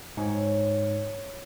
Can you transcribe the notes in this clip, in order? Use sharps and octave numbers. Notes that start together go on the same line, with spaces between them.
G#2 C#5 G5